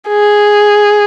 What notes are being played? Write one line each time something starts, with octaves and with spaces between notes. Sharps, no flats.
G#4